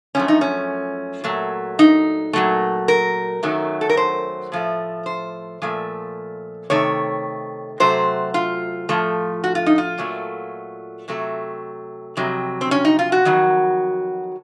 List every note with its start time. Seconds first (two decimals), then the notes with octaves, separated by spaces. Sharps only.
0.15 F#2 F3 A3 C#4
0.28 D#4
0.41 C#4
1.24 A#2 F#3 A3
1.79 D#4
2.33 A#2 F#3 A3
2.88 A#4
3.43 F#2 D#3 F#3 A3
3.81 A4
3.90 A#4
3.97 C5
4.52 A2 F3 A3
5.06 C5
5.62 A#2 F3 A3
6.70 C3 D#3 A3 C#5
7.80 C3 F#3 A3 C5
8.34 F4
8.89 A2 F3 A3
9.44 F#4
9.55 F4
9.66 D#4
9.78 F4
9.98 A#2 F#3 A3
11.08 C3 F#3 A3
12.17 F2 C3 F#3
12.61 C4
12.71 C#4
12.85 D#4
12.99 F4
13.12 F#4
13.25 F2 D#3 F#3